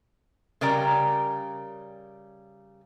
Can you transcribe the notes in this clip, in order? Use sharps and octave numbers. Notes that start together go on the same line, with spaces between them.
C#3 G3 A#4 D5 G5 A#5